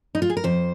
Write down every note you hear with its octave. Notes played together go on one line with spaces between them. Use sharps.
D#4
F4
G#4
A#4
F2 C5